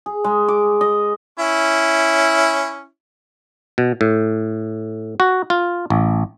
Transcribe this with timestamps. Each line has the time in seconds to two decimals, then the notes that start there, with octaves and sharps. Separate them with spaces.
0.06 G#4
0.24 G#3
0.48 D6
0.81 D#5
1.39 C#4 E4
3.78 B2
4.01 A2
5.20 F#4
5.50 F4
5.90 A1